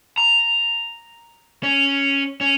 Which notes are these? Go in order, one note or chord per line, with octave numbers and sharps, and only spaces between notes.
A#5
C#4
C#4